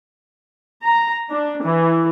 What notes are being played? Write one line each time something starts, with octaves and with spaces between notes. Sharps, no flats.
A#5
D4
E3